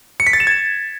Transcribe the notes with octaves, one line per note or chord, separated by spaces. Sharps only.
C#7
B6
A6
E7
G#6